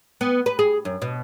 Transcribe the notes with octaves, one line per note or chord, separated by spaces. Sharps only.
B3
B4
G#4
F#2
B2